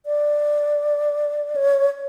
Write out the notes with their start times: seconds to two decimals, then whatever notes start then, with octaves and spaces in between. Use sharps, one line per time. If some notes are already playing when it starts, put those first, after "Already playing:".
0.06 D5
1.56 C#5